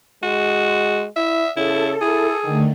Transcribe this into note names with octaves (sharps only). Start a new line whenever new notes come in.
G#3 F#4
E4 E5
C#3 E4 A4
E4 G#4
D3 D#3 A3